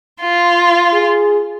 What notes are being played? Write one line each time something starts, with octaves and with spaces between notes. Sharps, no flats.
F4
G#4